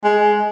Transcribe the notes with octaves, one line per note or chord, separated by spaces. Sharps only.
G#3